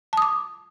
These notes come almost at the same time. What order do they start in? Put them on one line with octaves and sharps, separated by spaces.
A5 D#6 D6